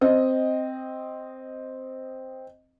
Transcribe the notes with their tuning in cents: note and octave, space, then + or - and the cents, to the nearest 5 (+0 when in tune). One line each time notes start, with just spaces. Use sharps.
C4 +0 D#5 +0